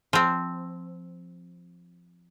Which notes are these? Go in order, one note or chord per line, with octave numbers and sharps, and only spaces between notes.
F3 C4